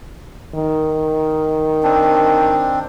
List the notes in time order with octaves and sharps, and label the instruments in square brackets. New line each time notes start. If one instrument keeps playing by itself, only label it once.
[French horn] D#3
[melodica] C4 D4